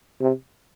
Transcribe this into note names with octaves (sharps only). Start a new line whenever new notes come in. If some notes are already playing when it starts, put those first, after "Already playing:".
C3